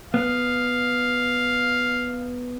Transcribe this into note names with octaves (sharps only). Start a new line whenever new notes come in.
B3 F5